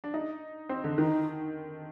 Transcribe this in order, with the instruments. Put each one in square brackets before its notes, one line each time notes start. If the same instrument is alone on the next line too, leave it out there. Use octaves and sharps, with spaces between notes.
[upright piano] D4
D#4
C4
D3
[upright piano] D#3 [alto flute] D#4